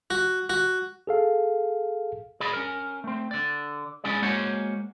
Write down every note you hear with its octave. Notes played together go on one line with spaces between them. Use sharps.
F#4
F#4
G#4 A4 F5
G#4 D5 D#5 B5
C#4 A#4
A3 C4
D3 D5
G#3 C#4 E4 G#4 D5
G#3 A#3 C#4 F#4 C5 C#5